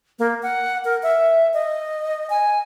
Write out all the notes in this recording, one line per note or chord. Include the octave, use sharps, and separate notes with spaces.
A#3
F#5
A#4
E5
D#5
G#5